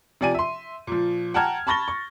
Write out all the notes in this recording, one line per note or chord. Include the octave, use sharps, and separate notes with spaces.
C3 F3 D5 G#5 D#7
E5 C6
A#2 F3
F#5 G5 A5 A#5 F6 G#6
A5 B5 C#6 A6 A#6 G7
C#6